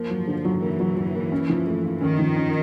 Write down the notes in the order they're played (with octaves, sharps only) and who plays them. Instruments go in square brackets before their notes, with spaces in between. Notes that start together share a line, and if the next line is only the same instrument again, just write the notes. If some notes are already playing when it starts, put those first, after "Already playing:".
Already playing: [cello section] F3 [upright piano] A#3
[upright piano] F#3
D3
F#3
[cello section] E3 [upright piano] A#3
[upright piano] F#3
F#3
A#3
C#4
F3
A3
F4
[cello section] D#3 [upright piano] C#4
[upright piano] F3
C#4